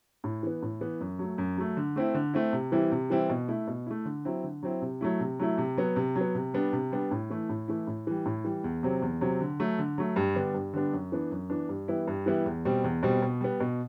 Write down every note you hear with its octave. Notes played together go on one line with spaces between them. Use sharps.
A2
E3 B3
A2
E3 B3
F#2
F#3 A3
F#2
F#3 A3
D3
A3 C4 E4
D3
A3 C4 E4
C3
E3 G3 C4 E4
C3
E3 G3 C4 E4
B2
A3 E4
B2
A3 E4
D3
F#3 C4 E4
D3
F#3 C4 E4
C3
F#3 A3 E4
C3
F#3 A3 E4
C3
F#3 B3
C3
F#3
B3
C3
G3 B3 D4
C3
G3 B3 D4
A2
E3 A3 E4
A2
E3 A3 E4
A2
E3 G3
A2
E3 G3
E2
C3 F#3 C4
E2
C3 F#3 C4
D3
F#3 A3
D3
F#3 A3
G2
D3 G3 B3 D4
G2
D3 G3 B3 D4
F#2
E3 B3 D4
F#2
E3 B3 D4
G2
E3 G3 B3 E4
G2
E3 G3 B3 E4
E2
B2 G3 C4
E2
B2 G3 C4
B2
G3 B3
B2